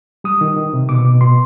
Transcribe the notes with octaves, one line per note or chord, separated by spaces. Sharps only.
G3 D#6
D#3
D#3
C3
B2 D6
B2
B2 C6